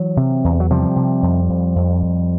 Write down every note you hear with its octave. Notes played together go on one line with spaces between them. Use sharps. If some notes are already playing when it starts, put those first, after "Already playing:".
Already playing: E3 F#3
C3
E2
F#3
C3 F3 G3
C3
F2
F2
F2
F2